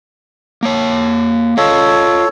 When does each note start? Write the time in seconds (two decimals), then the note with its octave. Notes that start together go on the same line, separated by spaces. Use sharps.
0.63 A#3 C#5
1.58 F4 A4 C#5 D#5 F5